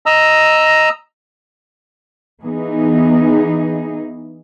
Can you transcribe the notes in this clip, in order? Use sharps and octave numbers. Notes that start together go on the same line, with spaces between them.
D#5 A#5 E6
E3 B3 D#4 G#4